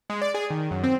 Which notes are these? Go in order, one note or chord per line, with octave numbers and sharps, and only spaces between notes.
G#3
D5
G#4
D#3
F#2
C4